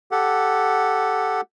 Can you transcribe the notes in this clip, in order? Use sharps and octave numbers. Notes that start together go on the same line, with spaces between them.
G4 A4 F#5